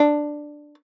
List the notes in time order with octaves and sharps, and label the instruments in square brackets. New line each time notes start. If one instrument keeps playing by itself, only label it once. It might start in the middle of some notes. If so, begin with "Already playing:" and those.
Already playing: [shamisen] D4